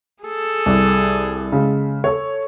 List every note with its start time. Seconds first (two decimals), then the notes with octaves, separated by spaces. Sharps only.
0.24 G#4 A4
0.66 C2
1.52 C#3 G#3
2.04 A4 C#5